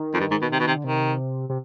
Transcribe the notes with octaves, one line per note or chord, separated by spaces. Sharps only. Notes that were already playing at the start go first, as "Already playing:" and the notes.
Already playing: D#3
F2
G2
G#2
B2
C3
B2
C3
D3
C3 D#3
C3